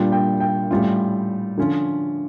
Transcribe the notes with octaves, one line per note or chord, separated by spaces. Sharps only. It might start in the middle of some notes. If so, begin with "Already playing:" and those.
Already playing: A#2 G3 D4 F4 G5
G5
G5
A2 G3 C#4 F4
D3 F3 C#4 F4